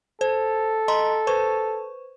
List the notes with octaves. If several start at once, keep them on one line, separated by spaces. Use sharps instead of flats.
A4 C5
D#5 A#5 C6
B4 C5 C#6